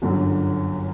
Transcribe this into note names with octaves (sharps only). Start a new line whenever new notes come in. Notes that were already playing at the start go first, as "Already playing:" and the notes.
G1 F#2 D3 F#3